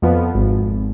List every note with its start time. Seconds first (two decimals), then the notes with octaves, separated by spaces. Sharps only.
0.02 F2 F3 B3
0.35 G#1